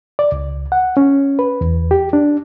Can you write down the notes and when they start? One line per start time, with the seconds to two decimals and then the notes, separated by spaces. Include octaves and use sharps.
0.19 D5
0.32 C#2
0.72 F#5
0.97 C#4
1.39 B4
1.61 E2
1.91 G4
2.13 D4